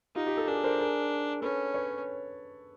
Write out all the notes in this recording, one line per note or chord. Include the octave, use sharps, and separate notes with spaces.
D#4 F4 G4
F4 G4
G4 A4
D4 G#4 A#4
A#4 C5
G#4 A#4
C#4 A4 B4
B4 C#5